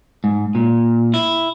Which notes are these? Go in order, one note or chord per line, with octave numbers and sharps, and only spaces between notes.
G#2
A#2
E4